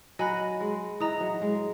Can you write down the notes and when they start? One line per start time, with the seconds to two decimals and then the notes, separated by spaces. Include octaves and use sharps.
0.19 F#3 D#5 G#5 B5 F#6
0.60 G#3
1.00 E3 D#5 A#5 D#6
1.21 F#3
1.42 G#3